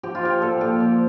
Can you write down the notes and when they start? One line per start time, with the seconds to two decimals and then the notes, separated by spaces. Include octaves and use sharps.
0.03 F3 G4
0.15 F4
0.23 F3 G4
0.42 A#2 A4
0.61 A#2 G4
0.80 F3